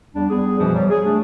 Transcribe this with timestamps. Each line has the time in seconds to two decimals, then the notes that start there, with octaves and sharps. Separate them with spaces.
0.15 E2 G3 D4
0.30 G3 B3 G#4
0.59 F#2 B2 E3 F3 G3
0.74 F#3 G3
0.90 G#4
1.05 A3 D4